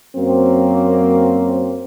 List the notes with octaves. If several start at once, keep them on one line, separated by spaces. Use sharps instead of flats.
F#2 F#3 A#3 C4